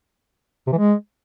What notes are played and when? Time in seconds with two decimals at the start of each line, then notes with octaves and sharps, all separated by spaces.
0.67 C3
0.72 E3
0.78 G#3